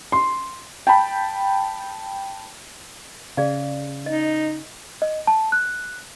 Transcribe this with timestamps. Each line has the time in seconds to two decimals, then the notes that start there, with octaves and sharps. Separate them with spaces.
0.12 C6
0.87 G5 A5 B5
3.37 C#3 G#4 D5 F5
4.06 D#4 D#5
5.02 D#5
5.27 A5
5.52 F#6